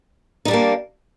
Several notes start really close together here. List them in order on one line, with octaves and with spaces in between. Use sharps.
D#4 G3 D4 A#3